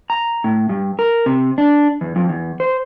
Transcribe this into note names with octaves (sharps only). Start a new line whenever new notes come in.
A#5
A2
G2
A#4
C3
D4
E2
F2
E2
C5